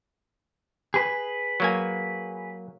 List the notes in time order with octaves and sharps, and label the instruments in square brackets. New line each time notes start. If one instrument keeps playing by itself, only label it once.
[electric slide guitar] G#4 B4
[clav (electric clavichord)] F#3 A#3 G#5